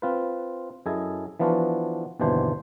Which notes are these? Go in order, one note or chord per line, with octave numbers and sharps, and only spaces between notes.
C4 F4 B4
F#2 E4 G#4 A4 D#5 G#5
E3 F3 B3 D4 F4 F#4
G1 D#2 B2 E3 D4 C5